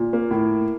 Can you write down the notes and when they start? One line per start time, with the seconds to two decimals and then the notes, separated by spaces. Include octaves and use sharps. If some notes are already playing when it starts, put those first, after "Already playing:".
Already playing: A#2
0.13 A#3
0.31 A2